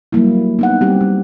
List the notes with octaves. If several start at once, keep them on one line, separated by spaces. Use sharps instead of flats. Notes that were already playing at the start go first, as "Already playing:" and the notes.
F#3 G3 A#3 E4
B3 D#4 F#5
G3 C4 G4
G3